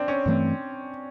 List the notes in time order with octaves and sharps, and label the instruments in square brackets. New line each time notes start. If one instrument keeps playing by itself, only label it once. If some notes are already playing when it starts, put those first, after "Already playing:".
Already playing: [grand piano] C4 D4
C#4
[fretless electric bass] G2 E3 A3 C4